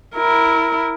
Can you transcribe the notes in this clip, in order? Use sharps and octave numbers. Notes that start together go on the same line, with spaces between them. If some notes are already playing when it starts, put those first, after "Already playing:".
E4 A#4